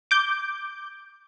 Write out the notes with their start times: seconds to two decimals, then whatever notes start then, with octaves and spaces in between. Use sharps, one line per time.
0.11 D6 G6